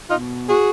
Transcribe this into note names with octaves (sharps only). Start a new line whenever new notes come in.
B2 D#4 F4
F#4 G#4